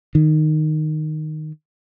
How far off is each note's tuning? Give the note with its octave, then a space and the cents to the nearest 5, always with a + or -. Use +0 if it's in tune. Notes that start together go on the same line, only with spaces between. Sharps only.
D#3 -10